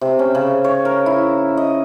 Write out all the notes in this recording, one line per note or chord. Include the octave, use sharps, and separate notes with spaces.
C3
C#4
C#3
C#5
A#4
E4
D#5